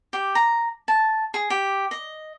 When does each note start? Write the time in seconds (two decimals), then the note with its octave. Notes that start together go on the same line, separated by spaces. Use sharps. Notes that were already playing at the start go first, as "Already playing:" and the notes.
0.13 G4
0.35 A#5
0.88 A5
1.34 G#4
1.50 G4
1.91 D#5